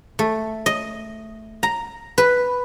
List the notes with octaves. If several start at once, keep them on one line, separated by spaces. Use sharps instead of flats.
A3
D#5
A#5
B4